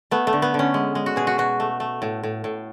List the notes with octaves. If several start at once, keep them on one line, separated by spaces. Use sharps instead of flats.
A3 B3
A3
D3
B3
D3 C#4
G#3
G#3
F#4
B2 G#4
F#4
B2 F#4
A3
A3
A2
A2
A2